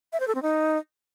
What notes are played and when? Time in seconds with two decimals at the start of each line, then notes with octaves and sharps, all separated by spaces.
0.13 E5
0.20 C5
0.28 A4
0.35 C4
0.42 D#4